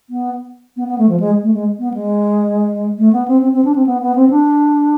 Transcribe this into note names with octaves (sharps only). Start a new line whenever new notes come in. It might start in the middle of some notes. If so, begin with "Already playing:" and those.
B3
B3
B3
A3
F3
G#3
A3
G#3
B3
G#3
A3
B3
C4
C4
C4
D4
C4
B3
B3
C4
D4